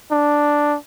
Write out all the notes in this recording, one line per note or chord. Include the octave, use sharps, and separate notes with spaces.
D4